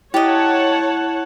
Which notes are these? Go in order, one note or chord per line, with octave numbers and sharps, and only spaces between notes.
E4 G4 C#5 D#5 F#5 A5